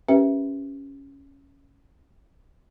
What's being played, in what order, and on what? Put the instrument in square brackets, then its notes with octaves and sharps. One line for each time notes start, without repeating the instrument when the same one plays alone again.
[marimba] C#4 G4 A#4 B4 E5 G5